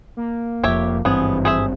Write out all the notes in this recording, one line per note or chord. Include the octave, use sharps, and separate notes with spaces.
A#3
F1 F2 G4 C#5 E5
G#1 G2 E3 B3 C4 G#4
G#4 C5 E5